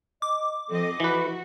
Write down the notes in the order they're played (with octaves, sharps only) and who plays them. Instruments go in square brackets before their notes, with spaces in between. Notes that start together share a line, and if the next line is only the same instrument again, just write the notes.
[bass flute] D#5 [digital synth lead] D6
[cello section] F3 C4 D#5 [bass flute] A4
[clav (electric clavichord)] E3 B4 [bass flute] E4 [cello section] F#4